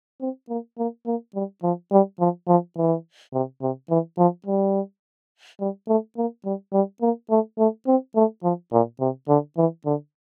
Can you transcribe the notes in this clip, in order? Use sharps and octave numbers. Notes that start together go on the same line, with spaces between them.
C4
A#3
A#3
A#3
G3
F3
G3
F3
F3
E3
C3
C3
E3
F3
G3
G3
A3
A#3
G3
G3
A#3
A3
A3
C4
A3
F3
A#2
C3
D3
E3
D3